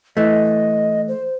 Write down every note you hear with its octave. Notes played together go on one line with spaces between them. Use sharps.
E3 A3 D#5
C5